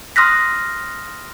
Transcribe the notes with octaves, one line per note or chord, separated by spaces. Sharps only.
C6 D#6 F6 F#6 A#6 B6